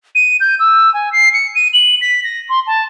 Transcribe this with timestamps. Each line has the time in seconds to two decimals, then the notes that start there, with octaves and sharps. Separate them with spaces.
0.15 D#7
0.40 G6
0.59 E6
0.94 G#5
1.13 C7
1.34 C#7
1.55 D#7
1.73 F#7
2.01 B6
2.24 A#6
2.49 C6
2.67 A5